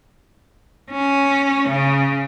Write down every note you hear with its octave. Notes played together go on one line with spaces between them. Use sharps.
C#4
C#3